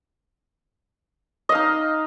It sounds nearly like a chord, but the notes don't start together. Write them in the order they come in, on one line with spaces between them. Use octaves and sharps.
D#5 F5 D#4